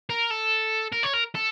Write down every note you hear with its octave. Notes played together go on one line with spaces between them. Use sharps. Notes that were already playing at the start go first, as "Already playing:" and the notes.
A#4
A4
A#4
C#5
A#4
A4